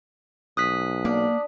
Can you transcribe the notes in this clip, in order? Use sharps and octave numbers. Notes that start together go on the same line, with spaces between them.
B1 D#6 F#6 B6
A#3 D4